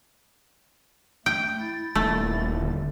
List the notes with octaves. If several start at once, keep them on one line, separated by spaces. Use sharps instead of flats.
A3 G5
E4 A6
D#1 A3
D3